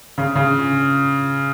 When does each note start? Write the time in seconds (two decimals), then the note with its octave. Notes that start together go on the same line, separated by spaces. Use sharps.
0.18 C#3
0.35 C#3